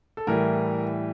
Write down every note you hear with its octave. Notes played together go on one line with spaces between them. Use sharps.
A4
A2 E3 G3 A#4